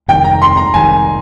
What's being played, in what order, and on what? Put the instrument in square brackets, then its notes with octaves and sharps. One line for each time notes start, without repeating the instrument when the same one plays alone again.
[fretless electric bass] F1 F2 D#3 G3 [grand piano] G5
[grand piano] A#5
C6
A#5
[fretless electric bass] F1 F2 D#3 G3 [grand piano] G#5